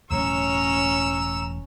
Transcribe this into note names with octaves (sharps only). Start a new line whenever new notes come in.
E1 A2 F#3 C#4 C#5 A#5 E6